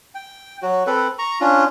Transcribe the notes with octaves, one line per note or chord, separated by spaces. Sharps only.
G5
F#3 F#4
C4 A4 B4
A#5 C#6
C#4 D4 F4